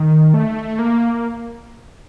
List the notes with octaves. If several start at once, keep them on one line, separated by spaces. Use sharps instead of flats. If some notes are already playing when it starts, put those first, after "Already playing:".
Already playing: D#3
A3
A#3